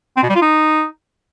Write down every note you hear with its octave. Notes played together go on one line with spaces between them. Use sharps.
C4
B2
G3
F4
D#4